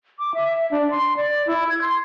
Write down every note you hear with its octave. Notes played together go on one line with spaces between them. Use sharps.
D6
E5
D4
C6
D5
E4
G#6
C6